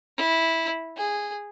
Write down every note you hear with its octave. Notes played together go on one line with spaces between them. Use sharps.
E4
G#4